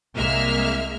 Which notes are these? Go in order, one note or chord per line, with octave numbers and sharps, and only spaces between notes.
C2 G#3 A#3 E5 F6